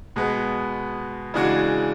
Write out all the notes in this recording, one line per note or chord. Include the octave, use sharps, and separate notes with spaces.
B2 G#3 B3
C#3 E3 G#3 D4 F#4